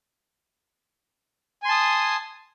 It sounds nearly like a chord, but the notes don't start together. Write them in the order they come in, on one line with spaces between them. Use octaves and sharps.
G#5 C6 A5 D#6